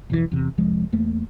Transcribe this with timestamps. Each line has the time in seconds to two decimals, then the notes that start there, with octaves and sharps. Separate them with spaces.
0.10 B1 F2 D#3 E3
0.31 E2 C3
0.58 C2 F2 F3 G#3
0.93 E2 A3 A#3